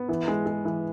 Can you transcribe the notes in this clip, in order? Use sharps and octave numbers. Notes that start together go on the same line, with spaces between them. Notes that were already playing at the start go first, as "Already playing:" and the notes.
Already playing: B3
E3
G#3
G#3
E3